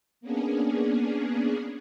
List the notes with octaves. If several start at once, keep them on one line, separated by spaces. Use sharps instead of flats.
A#3 B3 C#4 D4 G#4